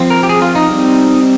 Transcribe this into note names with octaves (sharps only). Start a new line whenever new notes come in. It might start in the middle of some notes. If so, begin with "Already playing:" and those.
Already playing: F3 C4
A#4
G4
G#4
F4
D#4
G3 C4